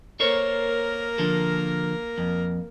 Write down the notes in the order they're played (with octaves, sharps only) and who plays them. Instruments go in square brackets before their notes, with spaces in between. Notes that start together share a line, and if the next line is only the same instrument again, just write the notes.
[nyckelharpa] A#3 A#4 [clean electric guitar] A4 C5 C#5
[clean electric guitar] D3 F3 A4
F2